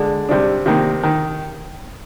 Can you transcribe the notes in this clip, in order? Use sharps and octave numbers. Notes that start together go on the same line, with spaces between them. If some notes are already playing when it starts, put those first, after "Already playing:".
Already playing: D3 G#3
C3 G3 D4
C3 D#3 A#3
D#3